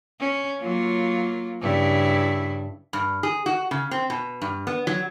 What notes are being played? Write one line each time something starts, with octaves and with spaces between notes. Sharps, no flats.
C#4
F#3 A#3 F4
G2 C#3 E4
G2
G#4
F#4
C#3
C4
B2
G2
B3
F#3